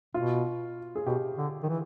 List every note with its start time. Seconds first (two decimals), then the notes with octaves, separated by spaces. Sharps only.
0.14 B2 F4
0.96 G#4
1.06 B2 G4
1.37 D3
1.63 D#3
1.69 E3